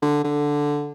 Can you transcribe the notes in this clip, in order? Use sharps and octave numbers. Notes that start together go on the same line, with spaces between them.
D3
D3